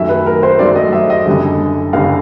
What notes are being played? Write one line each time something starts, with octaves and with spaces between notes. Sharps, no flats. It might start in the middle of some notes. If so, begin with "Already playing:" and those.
Already playing: F#2 D#3 F#3 A3 E5
B4
A#4
C5
F#2 D#3 F#3 A3 D5
D#5
E5
D#5
F#1 F#2 D3 G3
F#1 F#2 D3 G3 F5